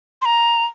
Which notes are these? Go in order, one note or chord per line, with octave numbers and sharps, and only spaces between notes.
C6
A#5